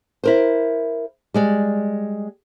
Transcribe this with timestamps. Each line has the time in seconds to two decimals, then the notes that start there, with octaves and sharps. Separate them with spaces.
0.24 E4 A#4 C5
1.34 G3 G#3 D5